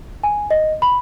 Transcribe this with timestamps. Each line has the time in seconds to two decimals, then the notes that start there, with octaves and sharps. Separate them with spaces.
0.23 G#5
0.51 D#5
0.82 B5